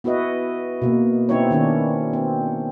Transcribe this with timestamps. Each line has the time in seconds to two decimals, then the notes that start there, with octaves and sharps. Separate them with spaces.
0.04 B3 E4 F#4 B4 D#5
0.82 B2 A#3
1.29 B3 C4 D#4 E4 C#5
1.51 D#3 C#4 D4
2.13 C4